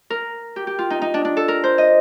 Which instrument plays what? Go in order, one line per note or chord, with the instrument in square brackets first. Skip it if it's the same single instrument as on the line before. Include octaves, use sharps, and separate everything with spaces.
[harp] A#4
G4
G4
F4
D#4
D#4
D4
D4
A4
A#4
C5
D#5